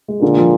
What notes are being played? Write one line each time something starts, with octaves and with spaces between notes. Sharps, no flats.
G#3
A#2 D3
F3